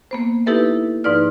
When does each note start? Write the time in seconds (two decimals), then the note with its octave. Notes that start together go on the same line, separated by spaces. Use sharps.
0.11 A#3 B3 C5
0.46 D#4 E4 G4 A4 B4 E5
1.04 G#2 F3 D#4 B4 D5 F6